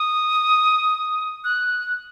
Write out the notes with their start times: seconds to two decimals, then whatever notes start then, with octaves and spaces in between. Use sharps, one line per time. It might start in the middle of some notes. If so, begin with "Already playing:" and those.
Already playing: D#6
1.44 F#6